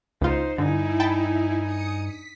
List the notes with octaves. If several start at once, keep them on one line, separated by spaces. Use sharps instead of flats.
C#2 D#4 F4 C5
G2 D3 D#4 E4 G#5
G5 A5 B5
E4
D#6 C#7
B6